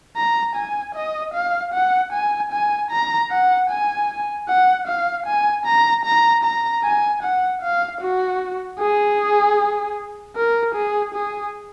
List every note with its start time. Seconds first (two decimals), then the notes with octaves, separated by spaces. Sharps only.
0.16 A#5
0.56 G#5
0.95 D#5
1.34 F5
1.73 F#5
2.13 G#5
2.52 G#5
2.91 A#5
3.31 F#5
3.70 G#5
4.48 F#5
4.87 F5
5.26 G#5
5.66 A#5
6.05 A#5
6.43 A#5
6.84 G#5
7.23 F#5
7.62 F5
8.00 F#4
8.79 G#4
10.36 A#4
10.75 G#4
11.14 G#4